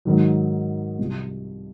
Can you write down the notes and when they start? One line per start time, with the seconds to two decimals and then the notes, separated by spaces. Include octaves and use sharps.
0.05 G#2 D#3 F#3
0.98 C2 C3 F3